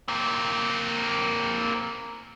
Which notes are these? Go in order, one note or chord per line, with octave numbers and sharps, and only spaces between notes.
A#3 C4